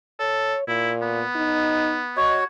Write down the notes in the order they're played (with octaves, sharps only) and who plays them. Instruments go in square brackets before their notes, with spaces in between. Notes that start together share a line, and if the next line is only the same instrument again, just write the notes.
[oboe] A4 [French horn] C#5
[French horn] A#2 [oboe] E4
[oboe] B3
[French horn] D#4
[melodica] F#4 C#5 [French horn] D#5